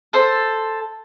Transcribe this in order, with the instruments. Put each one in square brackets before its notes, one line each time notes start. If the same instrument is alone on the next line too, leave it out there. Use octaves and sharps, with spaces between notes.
[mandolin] A4 C5